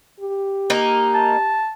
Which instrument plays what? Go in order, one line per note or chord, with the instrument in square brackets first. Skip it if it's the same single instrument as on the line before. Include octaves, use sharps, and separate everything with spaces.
[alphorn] G4
[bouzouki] A#3 D#4
[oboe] A5